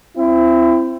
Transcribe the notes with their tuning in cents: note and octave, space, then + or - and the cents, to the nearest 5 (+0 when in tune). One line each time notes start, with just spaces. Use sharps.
C4 +0 E4 +30